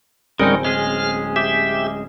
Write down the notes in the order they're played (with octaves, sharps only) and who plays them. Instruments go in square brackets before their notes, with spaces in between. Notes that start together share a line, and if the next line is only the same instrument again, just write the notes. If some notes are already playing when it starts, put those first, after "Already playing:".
[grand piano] D1 C4 G#5 [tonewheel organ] G3 C#4 A#4 [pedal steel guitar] G#3 D#4
[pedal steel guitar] G#3 C#4 G#4 [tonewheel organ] F6
[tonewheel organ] G4 E5